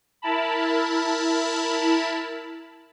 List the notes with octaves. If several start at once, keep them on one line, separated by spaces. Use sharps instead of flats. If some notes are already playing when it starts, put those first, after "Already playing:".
E4 A#4 A5 B5